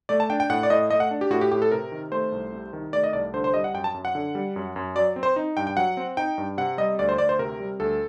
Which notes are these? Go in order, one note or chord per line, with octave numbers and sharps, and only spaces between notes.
A3 D5
A5
D4 G5
G5
A2 F#5
D5
A2 D#5
A3 D#5
F#5
D4
G4
A2 F#4
G4
A2 G4
A4
C3 A#4
D#3
A3 C5
C2
C3
D#3
A3 D5
D#5
C2 D5
D3 C5
C5
G3 D#5
F#5
F#2 G5
A5
F#2
F#5
D3
G3
F#2
F#2
F#3 D5
C4
C5
D#4
G2 G5
G5
F#3 F#5
C4
D#4 G5
G2
C3 F#5
G3 D#5
D2 D5
C5
D2 D5
C5
C3 A#4
G3
D2 A4